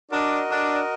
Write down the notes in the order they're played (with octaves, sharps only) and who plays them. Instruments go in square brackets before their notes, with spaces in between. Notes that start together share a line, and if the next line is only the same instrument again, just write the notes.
[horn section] D4 [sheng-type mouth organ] F#4 A#4 D#5
[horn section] D4